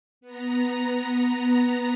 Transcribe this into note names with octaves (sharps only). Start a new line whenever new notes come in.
B3 A#5